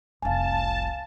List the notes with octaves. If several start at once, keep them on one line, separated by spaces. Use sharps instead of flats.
F1 C2 F5 G#5 A5